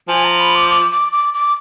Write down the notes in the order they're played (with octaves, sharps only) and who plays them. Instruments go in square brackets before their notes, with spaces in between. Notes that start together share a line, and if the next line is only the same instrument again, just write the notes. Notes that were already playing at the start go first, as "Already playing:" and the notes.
[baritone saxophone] F3 [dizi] G#5
[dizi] A#5
B5
D6
D6
D6
D6
D6